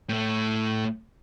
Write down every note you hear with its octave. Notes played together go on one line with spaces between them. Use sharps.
A2 A3